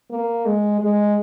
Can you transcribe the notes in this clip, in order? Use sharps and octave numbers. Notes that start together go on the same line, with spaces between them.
A#3
G#3
G#3